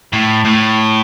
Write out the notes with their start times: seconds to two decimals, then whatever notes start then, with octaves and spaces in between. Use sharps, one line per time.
0.13 A2
0.45 A2